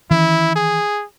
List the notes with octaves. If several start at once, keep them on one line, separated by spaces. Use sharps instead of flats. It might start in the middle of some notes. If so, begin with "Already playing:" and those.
D#3 E3 C#4 E4
G#4